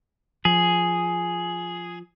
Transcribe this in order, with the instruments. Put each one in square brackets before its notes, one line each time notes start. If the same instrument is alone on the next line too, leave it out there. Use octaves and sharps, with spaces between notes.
[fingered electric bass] F3 [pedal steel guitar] G#4